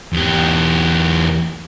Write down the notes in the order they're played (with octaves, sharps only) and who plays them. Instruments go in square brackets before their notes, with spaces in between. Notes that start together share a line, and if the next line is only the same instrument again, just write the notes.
[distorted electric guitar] E2 G4